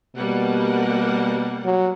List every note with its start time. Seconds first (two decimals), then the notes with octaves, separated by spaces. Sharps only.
0.16 B2 G3 A#3 F#5
1.65 F#3